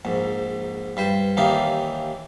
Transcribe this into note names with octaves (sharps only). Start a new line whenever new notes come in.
A#1 G#2
G2 B4 C5
D#2 E3 D4 D#4 G4 F5